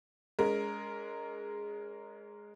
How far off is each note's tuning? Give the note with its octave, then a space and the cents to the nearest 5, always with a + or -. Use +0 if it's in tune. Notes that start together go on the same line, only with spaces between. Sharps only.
G#3 +0 C#4 +40 A#4 +0